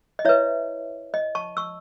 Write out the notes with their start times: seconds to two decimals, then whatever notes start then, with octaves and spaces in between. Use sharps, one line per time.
0.19 D#5
0.25 E4 B4 C#5 E5
1.14 D#5
1.35 A5 C#6
1.57 C#6 E6